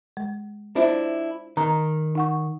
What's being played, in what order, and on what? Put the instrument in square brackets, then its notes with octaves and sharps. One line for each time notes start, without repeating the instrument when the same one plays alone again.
[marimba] G#3
[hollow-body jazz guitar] D4 E4 [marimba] F4 C5 E5
[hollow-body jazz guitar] D#3 [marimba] A#5
[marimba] D#4 F#5 C#6